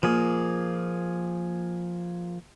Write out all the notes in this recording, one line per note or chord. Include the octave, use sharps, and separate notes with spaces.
A#2 F3 A#3 G#4